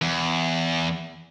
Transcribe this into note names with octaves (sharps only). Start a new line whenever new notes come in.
E2